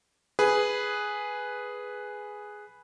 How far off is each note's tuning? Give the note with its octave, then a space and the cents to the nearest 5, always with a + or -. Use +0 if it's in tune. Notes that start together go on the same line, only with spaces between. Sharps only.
G#4 +0 B4 +0